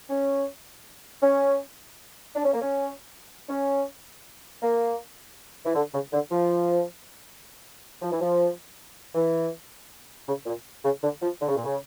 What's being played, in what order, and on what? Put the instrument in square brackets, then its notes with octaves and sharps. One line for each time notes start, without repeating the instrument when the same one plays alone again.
[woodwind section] C#4
C#4
D4
C#4
A#3
C#4
C#4
A#3
E3
D3
C#3
D3
F3
F3
E3
F3
E3
C#3
A#2
C#3
D3
F3
D3
C#3
A#2
C#3